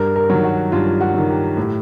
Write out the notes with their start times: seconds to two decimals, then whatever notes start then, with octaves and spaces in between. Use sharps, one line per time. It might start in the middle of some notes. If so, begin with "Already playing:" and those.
Already playing: G2 A#4
0.16 A#4
0.30 D#3 F#3
0.44 F#4
0.72 G2 F4
1.01 F#4
1.14 D#3 F#3
1.29 G4
1.57 A2